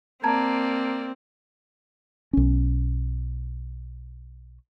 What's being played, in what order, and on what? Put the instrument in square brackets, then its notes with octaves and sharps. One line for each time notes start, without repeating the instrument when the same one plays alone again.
[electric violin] A#3 D5 [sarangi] C4 [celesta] A5 A#5 G#6
[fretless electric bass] B1 C#4